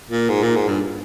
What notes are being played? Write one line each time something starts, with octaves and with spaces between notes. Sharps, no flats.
A#2
G#2
A#2
G#2
G2